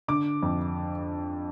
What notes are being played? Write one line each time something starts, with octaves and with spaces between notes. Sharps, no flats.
D3 D6
F2